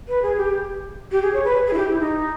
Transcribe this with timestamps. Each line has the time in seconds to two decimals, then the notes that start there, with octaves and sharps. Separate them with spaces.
0.08 B4
0.22 G#4
0.37 G4
1.12 G4
1.22 G#4
1.33 C#5
1.45 B4
1.67 G#4
1.73 E4
1.78 G4
1.89 E4
2.00 D#4